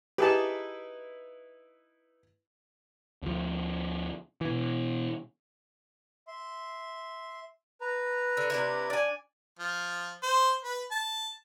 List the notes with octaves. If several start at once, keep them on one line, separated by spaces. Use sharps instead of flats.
D#4 E4 G4 G#4 B4 A5
D2 F3
B2 E3
E5 C6
B4 A#5
D3
C3 D4 E4
D4 D5 G#5
F3
C5
B4
A5